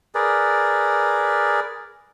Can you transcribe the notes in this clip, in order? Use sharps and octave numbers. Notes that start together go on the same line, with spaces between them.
G#4 A#4 B4 D5